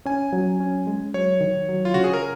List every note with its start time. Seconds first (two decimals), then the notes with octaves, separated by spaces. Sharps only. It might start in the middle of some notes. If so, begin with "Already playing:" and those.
0.06 C#4 G#5
0.33 F#3
0.60 C#4
0.87 G#3
1.14 F#3 C#5
1.41 D#3
1.69 F#3
1.85 F4
1.94 C#3 F#4
2.04 G#4
2.13 A#4